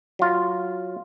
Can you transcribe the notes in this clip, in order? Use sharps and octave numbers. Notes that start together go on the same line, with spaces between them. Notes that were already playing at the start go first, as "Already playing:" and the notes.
F#3 F4